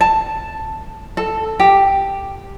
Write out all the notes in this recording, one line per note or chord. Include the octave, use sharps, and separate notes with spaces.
A5
A4
G4